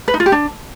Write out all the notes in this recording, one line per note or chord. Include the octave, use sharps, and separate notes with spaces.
B4
D#4
F4
G4
D4